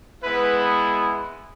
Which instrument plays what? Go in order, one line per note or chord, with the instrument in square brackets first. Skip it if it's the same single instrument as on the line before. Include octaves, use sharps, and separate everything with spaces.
[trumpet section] G#3 B3 E4 B4